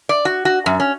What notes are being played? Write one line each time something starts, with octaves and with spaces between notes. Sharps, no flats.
D5
F#4
F#4
F#2
C#4